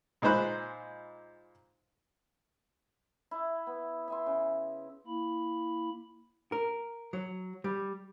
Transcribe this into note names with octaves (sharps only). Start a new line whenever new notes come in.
A#2 G#3 D#4 C5 B5 F#6
E4
B3
E5 G#5 C6
C#3
A#3 E4 B5
A#4
F#3
G3